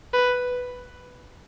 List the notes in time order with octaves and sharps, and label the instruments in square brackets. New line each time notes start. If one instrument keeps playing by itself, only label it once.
[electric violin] B4